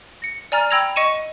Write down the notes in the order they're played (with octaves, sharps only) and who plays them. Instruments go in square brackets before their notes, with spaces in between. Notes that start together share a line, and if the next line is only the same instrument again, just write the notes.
[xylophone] A#6 C#7
D5 G#5 A#5 F6 A6
G5 B5 E6 G#6 A#6 F7
D#5 C#6 C#7 D#7 E7